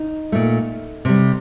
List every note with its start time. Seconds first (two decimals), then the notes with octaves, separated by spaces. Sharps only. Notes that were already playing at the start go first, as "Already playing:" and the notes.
Already playing: D#4
0.32 A#2 A3
1.05 C3 G3